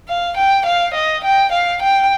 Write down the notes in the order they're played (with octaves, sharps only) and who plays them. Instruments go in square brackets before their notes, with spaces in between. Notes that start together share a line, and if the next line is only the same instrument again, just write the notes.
[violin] F5
G5
F5
D#5
G5
F5
G5